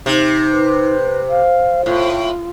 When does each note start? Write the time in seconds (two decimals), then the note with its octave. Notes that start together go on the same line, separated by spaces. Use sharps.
0.06 C3 D#4
0.51 B4
1.29 C5 F5
1.86 A2 F4